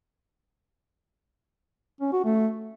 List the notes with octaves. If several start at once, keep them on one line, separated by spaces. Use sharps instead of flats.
C#4
F#4
A3